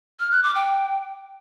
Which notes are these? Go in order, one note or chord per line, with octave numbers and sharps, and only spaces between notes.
F6
F#6
D6
G5